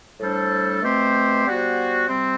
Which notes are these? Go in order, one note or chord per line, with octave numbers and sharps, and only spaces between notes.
A2 G3 D4 A4 C5
B2 A3 C4 G4 C5
G3 B3 F#4 C5
C3 G3 C4